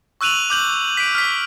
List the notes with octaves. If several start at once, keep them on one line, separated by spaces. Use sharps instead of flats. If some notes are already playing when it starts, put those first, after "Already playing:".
C#6 E6 F#6 D#7 F7 F#7
D6 G6 F#7
B6 D7
F6 B6